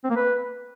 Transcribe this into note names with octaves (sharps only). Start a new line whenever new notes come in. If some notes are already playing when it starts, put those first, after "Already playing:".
C4
A#3
B4